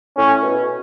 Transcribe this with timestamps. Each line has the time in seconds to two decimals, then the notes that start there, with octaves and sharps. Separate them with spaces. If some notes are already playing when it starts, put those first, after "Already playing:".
0.17 A2 C#4
0.43 B2